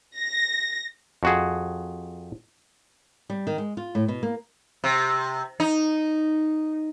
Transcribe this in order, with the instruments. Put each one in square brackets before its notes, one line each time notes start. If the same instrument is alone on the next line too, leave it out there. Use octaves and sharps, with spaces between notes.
[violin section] A#6
[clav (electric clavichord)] F2 F#4 G#4
[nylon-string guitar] G3
D#3
G#3
F4
A2
B2
A#3
[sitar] C3
D#4